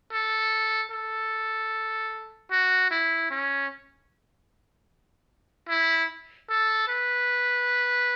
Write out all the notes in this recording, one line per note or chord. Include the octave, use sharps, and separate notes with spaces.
A4
A4
F#4
E4
C#4
E4
A4
B4